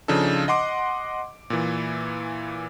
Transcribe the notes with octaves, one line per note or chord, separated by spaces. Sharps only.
C#3 F3 D4 D#4 A4
D#5 F#5 C6 D6
A#2 E3